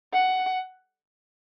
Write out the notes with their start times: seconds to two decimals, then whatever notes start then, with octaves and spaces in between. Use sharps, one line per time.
0.13 F#5